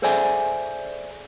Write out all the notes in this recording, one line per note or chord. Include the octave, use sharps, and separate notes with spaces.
G#4 A4 C5 D5 E5 G#5